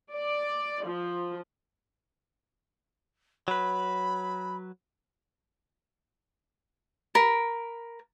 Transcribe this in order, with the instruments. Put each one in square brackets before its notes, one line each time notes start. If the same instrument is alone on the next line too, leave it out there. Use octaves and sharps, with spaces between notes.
[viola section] D5
F3
[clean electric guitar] F#3 B4 [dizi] B5
[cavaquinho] A#4 B5